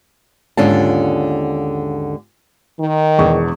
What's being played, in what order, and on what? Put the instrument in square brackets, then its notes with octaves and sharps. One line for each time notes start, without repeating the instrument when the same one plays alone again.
[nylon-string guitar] D#2 G#2 D3 C#4 F4 A5
[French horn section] D#3
[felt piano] E1 E2 C#6